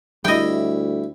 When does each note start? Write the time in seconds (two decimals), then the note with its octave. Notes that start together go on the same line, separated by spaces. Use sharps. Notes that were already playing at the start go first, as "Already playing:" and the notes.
0.25 D2 G3 E4 D#5 G5